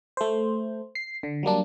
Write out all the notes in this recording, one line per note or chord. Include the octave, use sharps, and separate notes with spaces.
A3 C5
C7
D3
F#3 G3 A#3 D4